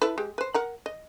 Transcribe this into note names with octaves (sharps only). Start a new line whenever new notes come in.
E4 A4 B4
G#3 G4
B4 C5
A#4 F#5 A#5
D#5